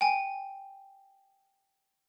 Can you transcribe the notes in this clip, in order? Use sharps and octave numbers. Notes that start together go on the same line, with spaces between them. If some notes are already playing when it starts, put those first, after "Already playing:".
G5 G#5